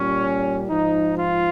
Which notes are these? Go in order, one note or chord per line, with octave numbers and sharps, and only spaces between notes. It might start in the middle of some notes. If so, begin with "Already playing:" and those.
Already playing: A#2 G3 C#4
G#2 F3 D#4
F4